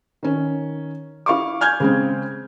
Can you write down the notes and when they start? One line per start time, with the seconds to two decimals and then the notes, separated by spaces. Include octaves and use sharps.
0.23 D#3 C#4
1.26 E4 F5 C#6 D6
1.61 G#5 F6 G6 G#6
1.80 C#3 G#3 C4